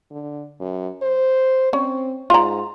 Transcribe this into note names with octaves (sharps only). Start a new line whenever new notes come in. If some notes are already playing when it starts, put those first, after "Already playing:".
D3
F#2
C5
C4 C#4
G#2 F4 A#5